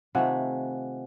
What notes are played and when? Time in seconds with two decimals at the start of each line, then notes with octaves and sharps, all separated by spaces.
0.15 C3 D#3 A3 F4 F#5 G#5